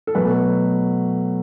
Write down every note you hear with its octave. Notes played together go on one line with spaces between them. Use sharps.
A4
B2 F#3 A3 B4